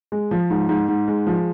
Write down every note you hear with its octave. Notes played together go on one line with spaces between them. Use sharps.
G#3
F3
G#2
G#2
G#2
G#3
F3